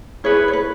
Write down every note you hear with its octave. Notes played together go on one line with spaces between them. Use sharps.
E4 G#4 B4 C#5
C#5
B4